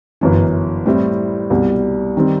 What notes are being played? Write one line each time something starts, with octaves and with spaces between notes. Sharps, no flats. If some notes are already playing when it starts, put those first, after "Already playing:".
G1 F#2 E3
A2 G3 C4 E4
C2 B2 G3
D#3 G3 C4